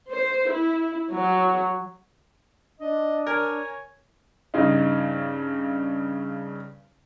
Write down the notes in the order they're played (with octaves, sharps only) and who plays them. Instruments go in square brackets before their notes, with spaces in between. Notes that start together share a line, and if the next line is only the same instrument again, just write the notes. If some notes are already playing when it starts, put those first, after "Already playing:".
[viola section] C5
E4
F#3
[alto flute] D4 [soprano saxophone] D#5
[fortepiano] A#4 [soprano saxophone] C#5 [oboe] G#5
[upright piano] G2 C#3 D#4